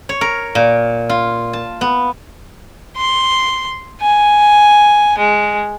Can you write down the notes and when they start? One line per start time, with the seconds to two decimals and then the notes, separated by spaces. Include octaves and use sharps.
0.09 C#5
0.21 A#4
0.55 A#2
1.09 F4
1.53 A5
1.81 B3
2.96 C6
4.01 G#5
5.18 G#3